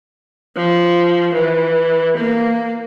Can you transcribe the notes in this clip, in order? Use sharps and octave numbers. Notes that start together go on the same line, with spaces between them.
F3
E3
A#3